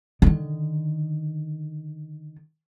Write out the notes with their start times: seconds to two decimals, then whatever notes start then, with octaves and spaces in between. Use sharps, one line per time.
0.22 D3 D#3